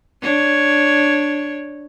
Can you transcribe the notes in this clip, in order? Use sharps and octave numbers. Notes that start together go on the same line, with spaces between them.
D4 C#5